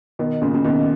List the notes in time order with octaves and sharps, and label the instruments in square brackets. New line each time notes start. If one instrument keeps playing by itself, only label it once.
[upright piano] B2 D#3
A#2 C#3
C#3
B2 D#3